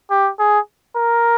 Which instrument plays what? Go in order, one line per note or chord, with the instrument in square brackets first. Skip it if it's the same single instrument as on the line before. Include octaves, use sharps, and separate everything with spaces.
[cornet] G4
G#4
A#4